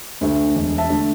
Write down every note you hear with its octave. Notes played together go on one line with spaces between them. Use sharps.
D2 D3 A3
E1
E5 A5
D3 A3